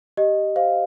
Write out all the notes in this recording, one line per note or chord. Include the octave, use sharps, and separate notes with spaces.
G4 D#5
C5 F5